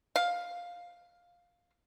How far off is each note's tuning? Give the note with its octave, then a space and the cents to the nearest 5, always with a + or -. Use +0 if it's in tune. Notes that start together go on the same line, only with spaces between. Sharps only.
F5 +10